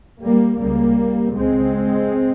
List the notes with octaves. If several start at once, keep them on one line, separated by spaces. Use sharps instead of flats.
G3 A#3
C#2 C#3 G3 A#3
C#2 C#3 G#3 C4